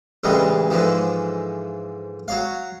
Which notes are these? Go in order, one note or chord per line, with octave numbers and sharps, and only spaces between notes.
A1 D2 C#3 E3 G3 G#3
G#2 D3 E3 F3
F#3 C#5 F5